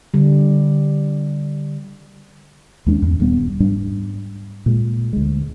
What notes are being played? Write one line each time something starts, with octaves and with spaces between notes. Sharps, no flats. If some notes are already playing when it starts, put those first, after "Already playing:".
D3 G3
D#2 G#3 C#4 D4
E2 G#2
D#1 G2 G3 B3
G#2 G3 D4
A#2 G#3
D2 G#3